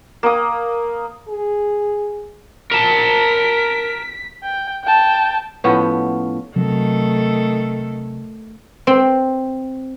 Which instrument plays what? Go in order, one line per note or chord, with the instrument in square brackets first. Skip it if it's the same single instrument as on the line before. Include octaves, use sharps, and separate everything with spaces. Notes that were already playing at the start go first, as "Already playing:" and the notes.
[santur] A#3 D#6
[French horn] G#4
[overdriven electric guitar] A#4 A5 [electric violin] B6
[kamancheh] G5
G5 A5
[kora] A2 F3 B3 C#4
[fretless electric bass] C3 F#3 [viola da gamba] D#3 A3 A4
[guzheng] C4